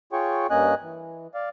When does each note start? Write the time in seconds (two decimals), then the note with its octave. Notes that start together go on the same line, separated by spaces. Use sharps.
0.13 F4 G#4 C#5 G5 C#6
0.50 G2 A#3 C#4 D#5 G#5 F#6
0.82 E3
1.34 D5 F5